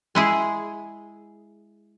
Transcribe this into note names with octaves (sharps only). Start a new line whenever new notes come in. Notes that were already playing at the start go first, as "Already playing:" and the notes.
G#3 E4 G#4